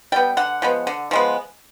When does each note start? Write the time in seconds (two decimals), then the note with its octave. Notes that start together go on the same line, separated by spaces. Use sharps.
0.12 G3 B3 G5
0.37 D3 F#5
0.62 F3 G#3 B3
0.87 D3
1.11 F3 G#3 B3